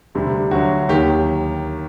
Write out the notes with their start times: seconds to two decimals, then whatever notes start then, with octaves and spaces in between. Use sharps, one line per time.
0.15 D2 C3 G3
0.51 D2 D3 F#3 F#4
0.89 D#2 D#3 F#3 G4